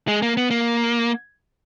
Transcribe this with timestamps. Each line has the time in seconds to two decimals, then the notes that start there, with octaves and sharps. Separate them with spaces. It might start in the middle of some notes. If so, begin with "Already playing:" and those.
0.08 G#3
0.22 A#3
0.37 B3
0.51 A#3